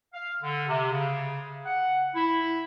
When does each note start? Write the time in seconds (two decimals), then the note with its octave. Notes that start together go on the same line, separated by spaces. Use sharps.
0.13 F5
0.41 D3
0.68 C3
0.92 C#3
1.65 F#5
2.15 E4